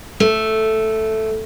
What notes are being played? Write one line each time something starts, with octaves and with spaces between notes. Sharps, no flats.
A3